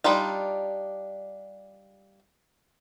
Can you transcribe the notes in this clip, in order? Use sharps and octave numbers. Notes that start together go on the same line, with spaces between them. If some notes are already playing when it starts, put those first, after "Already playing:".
G3 D4 D#4 F4